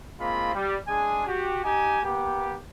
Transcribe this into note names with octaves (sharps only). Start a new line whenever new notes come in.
G#3 A#3 C4 F4 B5
G3
G#3 D4 G#4 G#5
F#4 G4
D#4 G4 G#5
A#3 B3 G4